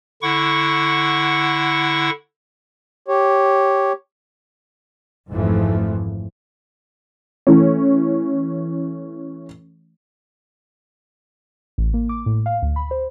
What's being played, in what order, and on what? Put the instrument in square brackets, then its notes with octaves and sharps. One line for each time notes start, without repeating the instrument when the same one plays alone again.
[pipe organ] D3 E4 F#5 C#6
[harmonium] G4 C#5
[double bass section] G#1 F2 G#2 E3 F3 A3
[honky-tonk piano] E3 A3 C#4
[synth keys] A1
A#3
D6
A2
F5
D2
B5
C5